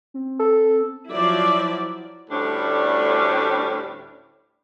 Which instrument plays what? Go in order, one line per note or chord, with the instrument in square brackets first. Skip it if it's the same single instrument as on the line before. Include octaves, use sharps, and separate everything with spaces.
[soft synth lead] C4
[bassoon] A4
[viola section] F3 F#3 E4 D5
[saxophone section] D2 A2 G3 C#4 D4